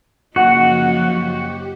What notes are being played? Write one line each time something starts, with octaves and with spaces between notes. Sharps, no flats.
F#2 C#3 F3 F#3 A#3 D#4 F#4 F#5
G4